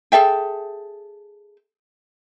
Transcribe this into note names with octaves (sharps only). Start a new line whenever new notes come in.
G#4 A4 E5 G5